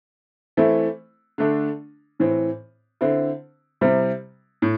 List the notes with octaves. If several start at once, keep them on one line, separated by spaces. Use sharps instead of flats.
E3 A3 C4 E4
D3 A3 D4
A2 E3 C4
D3 C4 E4
C3 G3 C4 E4
A2